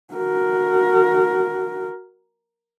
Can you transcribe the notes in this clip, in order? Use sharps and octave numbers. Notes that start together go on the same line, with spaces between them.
F#4 A#4